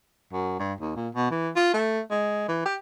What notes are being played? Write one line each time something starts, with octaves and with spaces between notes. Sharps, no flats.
F#2
G2
D#2
A#2
B2
E3
F4
A3
G#3
E3
G4